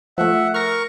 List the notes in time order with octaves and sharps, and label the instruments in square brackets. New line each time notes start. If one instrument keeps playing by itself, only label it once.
[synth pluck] F3 A3 [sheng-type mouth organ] E5 F#5
[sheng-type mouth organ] A#4 C#6 [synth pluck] F6 A#6